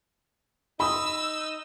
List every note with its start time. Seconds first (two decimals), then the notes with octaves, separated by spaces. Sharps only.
0.80 D#4 B5 D#6 E6